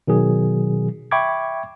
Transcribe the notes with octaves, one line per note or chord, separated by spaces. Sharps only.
B2 D#3 F#3 G#4
E5 G5 B5 C#6 D6 G#6